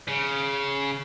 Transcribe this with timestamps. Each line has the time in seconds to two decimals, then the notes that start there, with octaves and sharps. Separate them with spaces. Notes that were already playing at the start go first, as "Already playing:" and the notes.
0.08 C#3